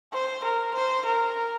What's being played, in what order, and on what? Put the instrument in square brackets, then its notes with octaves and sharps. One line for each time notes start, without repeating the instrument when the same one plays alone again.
[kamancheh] C5
A#4
C5
A#4